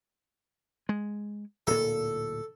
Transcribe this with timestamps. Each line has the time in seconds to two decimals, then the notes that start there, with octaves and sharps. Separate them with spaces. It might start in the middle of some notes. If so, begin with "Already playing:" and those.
0.89 G#3
1.67 D1 A#2 A4